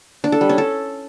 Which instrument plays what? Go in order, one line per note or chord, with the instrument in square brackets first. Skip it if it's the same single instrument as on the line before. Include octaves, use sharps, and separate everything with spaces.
[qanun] D4
A4
G3
C#4
A4